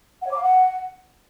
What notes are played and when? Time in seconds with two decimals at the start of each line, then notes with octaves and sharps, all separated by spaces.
0.21 F#5
0.26 C#5
0.31 D6
0.37 F5
0.42 F#5